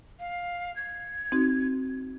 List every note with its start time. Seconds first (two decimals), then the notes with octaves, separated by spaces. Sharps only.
0.20 F5
0.76 G#6
1.32 C4 D#4 F#4